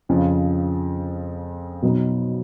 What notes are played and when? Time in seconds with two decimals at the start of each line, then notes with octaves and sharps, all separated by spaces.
0.09 F2 C#3 F3
1.82 B2 F#3 B3 D#4